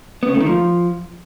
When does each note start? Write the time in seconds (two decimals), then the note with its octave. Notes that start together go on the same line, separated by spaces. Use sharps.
0.23 B3
0.29 C#3
0.35 A3
0.40 D#3
0.46 F3